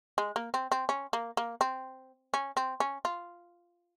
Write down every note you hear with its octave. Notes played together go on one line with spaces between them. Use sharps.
G#3
A#3
C4
C4
C#4
A#3
A#3
C4
C#4
C4
C#4
F4